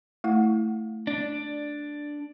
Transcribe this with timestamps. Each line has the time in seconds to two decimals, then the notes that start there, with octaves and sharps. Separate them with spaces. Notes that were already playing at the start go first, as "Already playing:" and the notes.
0.24 A3 E4 F#5
1.07 D4